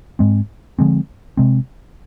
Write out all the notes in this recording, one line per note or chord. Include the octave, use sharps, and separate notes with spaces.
G#2 G#3 C4
D3 F3 G#3 C4
C3 G#3 C4